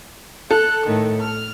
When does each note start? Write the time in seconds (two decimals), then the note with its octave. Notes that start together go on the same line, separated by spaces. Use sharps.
0.51 A4 F#6
0.86 A2 D#3
1.21 F6